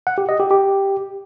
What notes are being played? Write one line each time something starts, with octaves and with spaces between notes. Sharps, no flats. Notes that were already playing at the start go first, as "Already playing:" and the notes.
F#5
G4
D#5
G4
G4